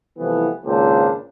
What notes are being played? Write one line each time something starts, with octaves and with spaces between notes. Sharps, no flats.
C2 E3 F3 A3 B3
G#1 C#2 A#2 A#3 D4 C5